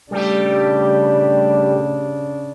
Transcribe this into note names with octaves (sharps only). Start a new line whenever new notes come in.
C#3 G3 A3 D4 G4